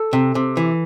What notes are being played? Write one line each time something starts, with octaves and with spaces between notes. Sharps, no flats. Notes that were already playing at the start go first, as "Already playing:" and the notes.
Already playing: A4
C3
C3
E3